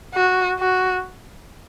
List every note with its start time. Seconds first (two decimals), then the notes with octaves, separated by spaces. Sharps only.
0.15 F#4
0.59 F#4